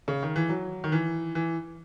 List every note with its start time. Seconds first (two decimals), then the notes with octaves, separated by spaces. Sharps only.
0.08 C#3
0.23 D#3
0.36 E3
0.49 F#3
0.84 D#3
0.92 E3
1.35 E3